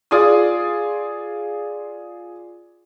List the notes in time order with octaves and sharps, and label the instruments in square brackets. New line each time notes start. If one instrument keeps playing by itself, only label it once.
[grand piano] F4 G#4 D5 C6 D#6